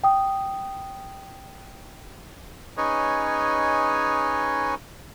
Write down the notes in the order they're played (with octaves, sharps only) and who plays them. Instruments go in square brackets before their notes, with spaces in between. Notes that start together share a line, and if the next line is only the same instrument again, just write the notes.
[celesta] G5 D#6
[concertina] C#4 D#4 G#4 B4 C#5 D#5